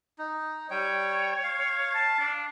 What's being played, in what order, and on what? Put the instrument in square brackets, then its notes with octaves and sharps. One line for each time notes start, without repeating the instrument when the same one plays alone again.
[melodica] D#4
[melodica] G3 G5 [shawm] C#5
[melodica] F5
[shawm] A5
D4